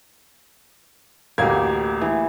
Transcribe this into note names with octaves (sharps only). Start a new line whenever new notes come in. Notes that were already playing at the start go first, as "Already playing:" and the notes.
A1 D2 A#3 G4 G#6
E3